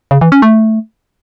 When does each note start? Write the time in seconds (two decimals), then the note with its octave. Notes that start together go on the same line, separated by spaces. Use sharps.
0.11 C#3
0.21 E3
0.32 C#4
0.42 A3